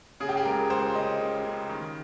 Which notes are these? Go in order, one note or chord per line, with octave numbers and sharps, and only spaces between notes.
C#3 G#4
G4
G#4
C#2 A#4
C#2 C5
C#3 D#5
C#3
C#3
D#3